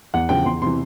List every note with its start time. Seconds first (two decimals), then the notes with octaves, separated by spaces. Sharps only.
0.14 E2 F#5
0.29 C#3 F3 G5
0.45 E2 C6
0.61 C3 E3 C6